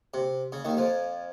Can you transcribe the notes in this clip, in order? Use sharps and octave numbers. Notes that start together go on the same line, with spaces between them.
C3
C#3
D#2 D#3
F2 F3